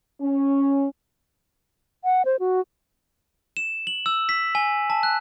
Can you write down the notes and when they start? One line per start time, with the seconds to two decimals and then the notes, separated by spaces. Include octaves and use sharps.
0.21 C#4
2.04 F#5
2.25 C5
2.40 F#4
3.57 E7
3.87 F#7
4.06 E6
4.29 B6
4.55 G#5
4.90 A5
5.03 F#6